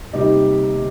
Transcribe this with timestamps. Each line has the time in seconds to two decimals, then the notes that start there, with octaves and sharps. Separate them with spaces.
0.13 C3 G3 A#3 D#4 G4
0.74 C3 G3